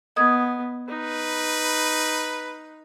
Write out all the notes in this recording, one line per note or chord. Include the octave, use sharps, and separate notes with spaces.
B3 D#5 D#6 G#6
D#4 B4